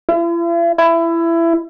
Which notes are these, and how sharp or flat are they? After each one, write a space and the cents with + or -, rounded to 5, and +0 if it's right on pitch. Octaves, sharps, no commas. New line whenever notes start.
E4 +45
E4 +20